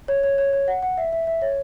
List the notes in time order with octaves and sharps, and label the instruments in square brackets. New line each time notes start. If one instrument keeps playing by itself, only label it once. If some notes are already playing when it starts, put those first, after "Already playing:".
[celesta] C#5
C#5
C#5
C#5
F#5
F#5
E5
E5
E5
C#5